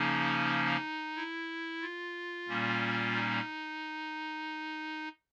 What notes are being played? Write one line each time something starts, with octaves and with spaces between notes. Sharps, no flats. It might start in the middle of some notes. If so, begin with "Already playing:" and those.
Already playing: C#3 F3 A#3 C#4 D#4
E4
F4
A#2 G3 A#3 C#4
D#4